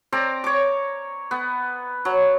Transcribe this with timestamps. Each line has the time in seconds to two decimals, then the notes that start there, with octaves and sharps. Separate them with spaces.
0.12 C4 D5 A#5
0.44 C#5 D6
1.31 B3
2.05 F#3